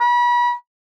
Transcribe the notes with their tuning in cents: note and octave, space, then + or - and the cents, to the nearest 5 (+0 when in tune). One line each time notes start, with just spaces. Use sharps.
B5 -35